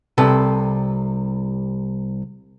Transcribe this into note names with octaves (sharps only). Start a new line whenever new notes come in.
C2 C3 A4 B4